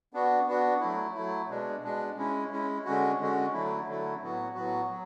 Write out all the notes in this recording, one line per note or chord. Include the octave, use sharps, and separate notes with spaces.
B3 D4 F#4
B3 D4 F#4
F#3 A3 E4
F#3 A3 E4
B2 G#3 D4
B2 G#3 D4
G#3 C#4 E4
G#3 C#4 E4
D3 G#3 C#4 F#4
D3 G#3 C#4 F#4
D3 F#3 A3 E4
D3 F#3 A3 E4
A2 F#3 B3 F#4
A2 F#3 B3 F#4
F#3